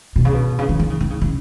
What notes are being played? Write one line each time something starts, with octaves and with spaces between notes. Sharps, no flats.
B2
C#3
B2
C#3
D#3
D#3
C#3
D#3
C#3
C#3